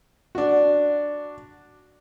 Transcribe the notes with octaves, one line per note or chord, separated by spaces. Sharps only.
D4 F#4